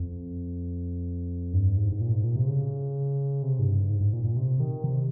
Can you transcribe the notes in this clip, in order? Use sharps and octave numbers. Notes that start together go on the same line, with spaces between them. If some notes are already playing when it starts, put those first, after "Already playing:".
Already playing: F2
G2
G#2
G#2
A#2
G#2
A#2
C3
C#3
C3
G#2
G2
G#2
G#2
A#2
A#2
C3
D#3
C3